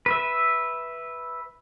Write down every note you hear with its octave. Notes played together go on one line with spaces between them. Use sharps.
B4 E5